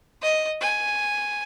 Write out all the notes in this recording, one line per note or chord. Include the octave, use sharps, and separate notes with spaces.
D#5
G#5